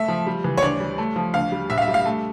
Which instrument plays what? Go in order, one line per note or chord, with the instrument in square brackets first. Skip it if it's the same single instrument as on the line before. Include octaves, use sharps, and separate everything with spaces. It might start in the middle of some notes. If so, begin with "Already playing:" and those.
Already playing: [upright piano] A3 E5
F3
G3
E3
C#5
D2 D5
G3
A3
F3
D2 F5
G3
A#1 E5
F5
E5
G3
F5
A3